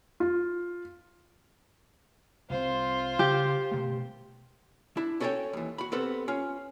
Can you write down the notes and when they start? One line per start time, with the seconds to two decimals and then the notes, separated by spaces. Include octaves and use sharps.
0.20 F4
2.50 C2 C4 F4 C5
3.19 C#3 G4
3.71 G2 B2 A3
4.97 D4 E4
5.20 C#4 F#4 A4 B4 C#5 G5
5.53 D#2 E3
5.78 F#4 B5
5.92 C2 B3 C4 A4 B4
6.28 C#4 F4